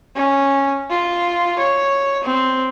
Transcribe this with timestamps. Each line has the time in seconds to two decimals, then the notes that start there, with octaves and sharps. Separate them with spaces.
0.16 C#4
0.90 F4
1.59 C#5
2.24 C4